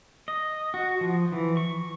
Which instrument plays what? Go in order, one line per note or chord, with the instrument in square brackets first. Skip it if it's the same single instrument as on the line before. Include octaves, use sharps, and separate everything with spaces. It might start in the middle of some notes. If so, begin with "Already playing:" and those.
[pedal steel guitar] D#5
F#4
F3
E3
C#6